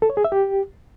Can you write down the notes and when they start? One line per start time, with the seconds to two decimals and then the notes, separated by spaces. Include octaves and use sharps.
0.02 A4
0.10 C#5
0.17 G#4
0.25 E5
0.32 G4